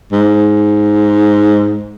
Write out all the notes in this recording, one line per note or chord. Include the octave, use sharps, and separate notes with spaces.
G#2